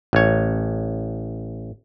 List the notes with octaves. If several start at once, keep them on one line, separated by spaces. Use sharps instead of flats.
A1 C#5